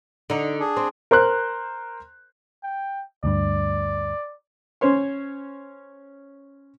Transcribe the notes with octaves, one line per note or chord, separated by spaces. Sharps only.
D3 D#4
D4 G#4
C4
A#4 C5 C6 F#6
G5
D2 G2 D5
C#4 C5 C#5 C6